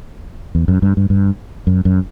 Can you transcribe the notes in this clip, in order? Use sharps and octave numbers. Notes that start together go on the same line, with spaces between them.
E2
F#2
G2
G2
G2
F#2
F#2